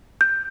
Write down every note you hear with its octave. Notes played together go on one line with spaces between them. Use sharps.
G6